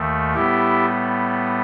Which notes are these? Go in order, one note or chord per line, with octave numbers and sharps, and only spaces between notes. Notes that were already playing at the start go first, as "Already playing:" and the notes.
Already playing: D#2 D#3 A3
A2 G3 B3 E4 G4